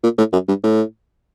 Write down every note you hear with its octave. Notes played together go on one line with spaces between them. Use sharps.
A#2
A2
F#2
G2
A2